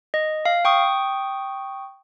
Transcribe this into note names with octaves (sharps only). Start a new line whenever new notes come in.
D#5
F5
G5 C#6 D#6